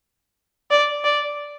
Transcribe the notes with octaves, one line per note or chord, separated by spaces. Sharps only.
D5
D5